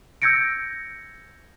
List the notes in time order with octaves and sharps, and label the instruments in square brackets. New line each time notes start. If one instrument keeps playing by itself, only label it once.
[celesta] E6 G6 G#6 A#6 C#7 D7